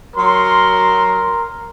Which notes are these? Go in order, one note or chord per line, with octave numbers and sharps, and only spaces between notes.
F#3 A#4 C6